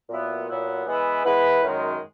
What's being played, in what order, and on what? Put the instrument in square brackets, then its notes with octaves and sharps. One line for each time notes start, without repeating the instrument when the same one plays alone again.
[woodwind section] A#2 F#3 B3 E4
A#2 F#3 B3 E4
E3 G#3 B3 E4 B4
E3 G#3 B3 E4 B4
F#2 D#3 G#3